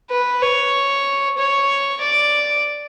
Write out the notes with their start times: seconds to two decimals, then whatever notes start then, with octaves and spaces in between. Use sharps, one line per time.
0.11 B4
0.42 C#5
1.38 C#5
2.01 D5